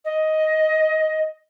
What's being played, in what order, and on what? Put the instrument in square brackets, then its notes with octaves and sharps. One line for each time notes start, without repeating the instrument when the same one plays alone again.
[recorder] D#5